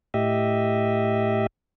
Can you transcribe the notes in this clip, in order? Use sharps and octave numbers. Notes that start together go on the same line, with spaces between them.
A2 G4 D#5 E5